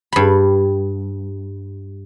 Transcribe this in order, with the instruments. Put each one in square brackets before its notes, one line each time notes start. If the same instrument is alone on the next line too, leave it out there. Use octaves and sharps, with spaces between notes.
[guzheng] G2 B5